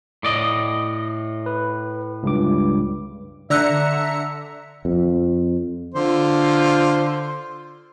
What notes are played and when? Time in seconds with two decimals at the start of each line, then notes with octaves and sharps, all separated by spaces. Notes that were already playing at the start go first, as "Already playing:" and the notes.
0.23 A2 D5 D#5
1.46 B4
2.23 C#2 G2 D6
3.50 D3 D5 E5 A#5 E6 F#6 C#7
4.85 F2
5.94 D3 F4 C5